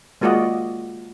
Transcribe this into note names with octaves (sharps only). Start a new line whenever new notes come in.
G#3 A#3 F4 F#4 D5 D#5